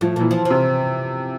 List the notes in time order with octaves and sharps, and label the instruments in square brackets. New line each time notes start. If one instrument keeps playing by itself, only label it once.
[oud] A2 [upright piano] F3
[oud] A#2 [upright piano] E3
[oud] F3
F3
[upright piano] C3